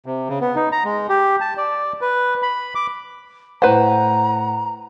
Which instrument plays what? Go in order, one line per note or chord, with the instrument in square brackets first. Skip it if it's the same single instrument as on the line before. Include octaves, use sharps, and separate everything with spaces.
[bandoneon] C3
C#3
B3
D#4
A#5
G#3
G4
A5
D5
B4
B5
D6
[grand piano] A2 F#5 [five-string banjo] B4 C5 [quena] A#5